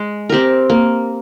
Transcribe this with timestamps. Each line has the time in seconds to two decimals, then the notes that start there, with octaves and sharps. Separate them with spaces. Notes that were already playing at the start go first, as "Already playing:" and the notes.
Already playing: G#3
0.29 C4 G4 A#4
0.70 A#3